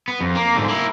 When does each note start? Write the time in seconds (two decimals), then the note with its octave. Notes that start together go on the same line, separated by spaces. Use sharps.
0.08 B3
0.21 F2
0.35 A#3
0.55 G#2 D3
0.68 A#3 E4